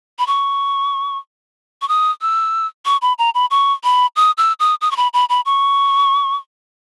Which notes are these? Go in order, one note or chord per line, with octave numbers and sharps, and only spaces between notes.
B5
C#6
C#6
D#6
E6
C#6
B5
A#5
B5
C#6
B5
D#6
E6
D#6
D#6
C#6
B5
B5
B5
C#6